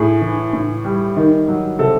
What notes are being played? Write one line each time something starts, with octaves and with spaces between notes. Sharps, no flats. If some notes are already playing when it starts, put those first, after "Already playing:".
Already playing: A2 G#4
E3
A2
G3
D#3
F#3
C3 A4